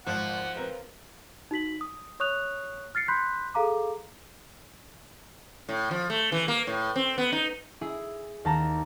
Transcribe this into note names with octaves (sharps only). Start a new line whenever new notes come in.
G#1 F3 F#5
C4 A#4 B4
D#4 F#4 B6 F#7
D#6
C#5 C#6 D#6 F#6 F7
F6 A6 C7 C#7
B5 C6 F#6 G6 B6
G#4 A4 F5 A#5 D6
A2
F3
A3
E3
A#3
A2
C4
B3
D#4
E4 G#4
D#2 A5 A#5